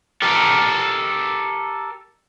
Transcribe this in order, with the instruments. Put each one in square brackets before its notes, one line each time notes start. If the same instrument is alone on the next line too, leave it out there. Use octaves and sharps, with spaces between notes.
[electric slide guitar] G4 A4 A#4